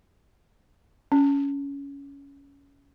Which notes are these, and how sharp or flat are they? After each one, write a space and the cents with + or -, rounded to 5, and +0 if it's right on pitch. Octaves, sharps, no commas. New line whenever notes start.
C#4 +15